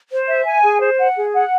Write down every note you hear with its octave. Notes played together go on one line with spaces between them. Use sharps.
C5
E5
G#5
G#4
C5
F#5
G#4
F#5